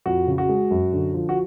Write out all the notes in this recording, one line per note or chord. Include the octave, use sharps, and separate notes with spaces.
F2 F#4
C#3
F#4
G#3
F#2
D3
F3
F#4